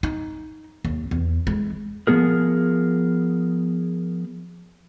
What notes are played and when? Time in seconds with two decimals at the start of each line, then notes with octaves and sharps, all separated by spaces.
0.03 D#4
0.85 D#2
1.11 E2
1.47 E3 G#3
2.07 F3 F#3 B3 G#4 A#4